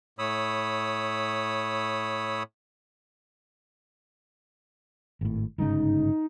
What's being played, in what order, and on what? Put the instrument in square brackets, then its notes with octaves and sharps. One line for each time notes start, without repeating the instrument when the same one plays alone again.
[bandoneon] A2 C#5 B5 D#6 E6
[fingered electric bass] G#1 A2
[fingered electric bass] G1 G#2 C#3 [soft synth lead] D#4